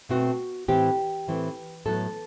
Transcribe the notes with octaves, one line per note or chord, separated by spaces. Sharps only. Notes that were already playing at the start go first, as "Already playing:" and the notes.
B2 A3 C4 F#4
A2 E3 A3 C4 G4
A2 E3 A3 C4
A2 F#3 B3 A4